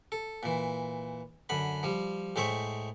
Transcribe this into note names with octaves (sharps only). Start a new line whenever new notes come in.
A4
A#2 E3
F#2 D3 B5
F3 G3
A2 G#3 C5 E5 C#6